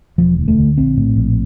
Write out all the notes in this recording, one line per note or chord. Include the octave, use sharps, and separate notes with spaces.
E1 F3
D2
A3
D3
A#1 C4
A2
A#1